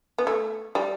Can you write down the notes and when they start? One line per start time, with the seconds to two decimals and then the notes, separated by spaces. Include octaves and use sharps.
0.18 B3
0.27 A3
0.75 G3